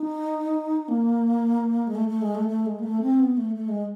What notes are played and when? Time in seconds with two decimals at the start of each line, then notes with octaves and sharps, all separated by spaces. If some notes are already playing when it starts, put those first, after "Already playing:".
Already playing: D#4
0.88 A#3
1.87 G#3
1.95 A3
2.08 A3
2.21 G#3
2.35 A3
2.48 A3
2.66 G#3
2.79 A#3
2.83 A3
3.02 C4
3.20 B3
3.37 A3
3.55 A3
3.69 G#3